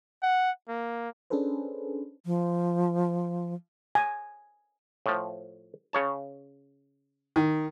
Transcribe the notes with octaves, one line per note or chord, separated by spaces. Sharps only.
F#5
A#3
C#4 D4 G#4 A4 B4 C5
F3
G#5
A2 F3
C#3 C#5 A5
D#3